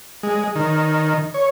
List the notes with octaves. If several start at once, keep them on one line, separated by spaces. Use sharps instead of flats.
G#3
D#3
C#5